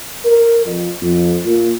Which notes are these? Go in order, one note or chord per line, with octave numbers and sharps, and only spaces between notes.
A#4
F2
F2
A#2